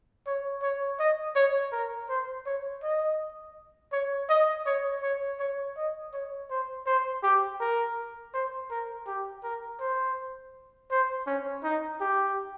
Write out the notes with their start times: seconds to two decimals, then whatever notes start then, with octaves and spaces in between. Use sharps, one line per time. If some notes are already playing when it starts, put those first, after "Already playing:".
0.26 C#5
0.62 C#5
0.99 D#5
1.36 C#5
1.72 A#4
2.09 C5
2.46 C#5
2.83 D#5
3.92 C#5
4.29 D#5
4.66 C#5
5.02 C#5
5.39 C#5
5.77 D#5
6.13 C#5
6.50 C5
6.86 C5
7.23 G4
7.60 A#4
8.33 C5
8.70 A#4
9.07 G4
9.43 A#4
9.80 C5
10.91 C5
11.26 C#4
11.63 D#4
12.00 G4